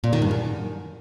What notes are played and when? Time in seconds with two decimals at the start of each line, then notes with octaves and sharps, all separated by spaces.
0.04 A#2
0.13 D#3
0.22 G2
0.31 F#2